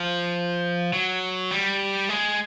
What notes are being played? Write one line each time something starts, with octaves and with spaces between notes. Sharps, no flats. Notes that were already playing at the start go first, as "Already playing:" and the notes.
Already playing: F3
F#3
G3
G#3